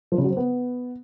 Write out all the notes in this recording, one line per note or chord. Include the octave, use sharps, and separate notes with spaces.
F3
C#3
F#3
C4
B3